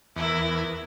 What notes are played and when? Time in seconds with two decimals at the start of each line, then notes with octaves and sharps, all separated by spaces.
0.16 E2 E4 A#4